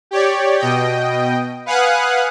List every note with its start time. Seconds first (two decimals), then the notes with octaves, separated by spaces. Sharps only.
0.11 G4 C#5 D5
0.58 B2 D#5 G5
1.66 B4 F5 F#5 G#5 D#6 F#6